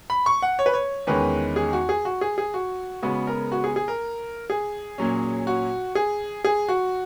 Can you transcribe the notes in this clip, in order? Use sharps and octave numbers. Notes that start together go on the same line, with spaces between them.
B5
C#6
F#5
C#5
B4
C#5
E2 D#3 G#3 C#4 B4
G#4
F#4
G#4
F#4
G#4
G#4
F#4
C#3 G#3 B3 F#4
A#4
F#4
G#4
G#4
A#4
G#4
A#2 F#3 C#4
F#4
G#4
G#4
F#4